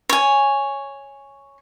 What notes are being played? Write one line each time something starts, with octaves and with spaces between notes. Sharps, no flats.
C#5 G#5